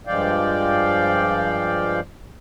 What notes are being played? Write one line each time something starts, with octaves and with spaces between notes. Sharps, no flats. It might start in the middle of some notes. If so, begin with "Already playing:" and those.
G2 F3 G#3 D5 F5 G5